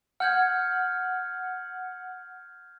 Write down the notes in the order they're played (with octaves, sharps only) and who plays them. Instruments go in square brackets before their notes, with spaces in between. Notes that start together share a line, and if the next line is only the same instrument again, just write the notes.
[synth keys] F#5 [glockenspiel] F6 G6 G#6